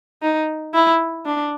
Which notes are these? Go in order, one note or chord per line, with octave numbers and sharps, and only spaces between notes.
D#4
E4
D4